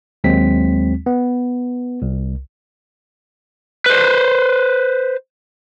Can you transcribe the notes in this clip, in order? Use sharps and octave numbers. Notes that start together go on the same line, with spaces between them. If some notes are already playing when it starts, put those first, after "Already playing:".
D#2 F#3 G#3 C4 B6
B3
C2
B4 C5